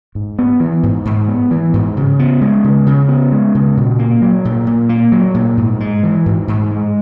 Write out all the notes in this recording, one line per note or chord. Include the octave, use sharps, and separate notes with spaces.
G#2
B3
E3
G#2
G#2
B3
E3
G#2
C#3
B3
G#3
C#3
C#3
B3
G#3
C#3
A#2
A#3
F#3
A#2
A#2
A#3
F#3
A#2
G#2
G#3
E3
G#2
G#2
G#3